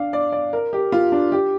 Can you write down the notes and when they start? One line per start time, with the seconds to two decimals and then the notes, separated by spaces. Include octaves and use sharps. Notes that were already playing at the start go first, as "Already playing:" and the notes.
Already playing: D4 F5
0.13 D5
0.32 D5
0.53 A#4
0.73 G4
0.92 F4
1.12 D4
1.32 G4